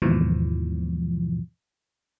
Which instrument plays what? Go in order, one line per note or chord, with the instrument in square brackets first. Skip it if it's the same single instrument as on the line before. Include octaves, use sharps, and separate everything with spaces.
[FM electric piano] D#2 G#2 B2 E3 F3